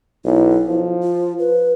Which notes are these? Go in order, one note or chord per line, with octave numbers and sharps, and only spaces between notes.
B1 E4
F3
F4
B4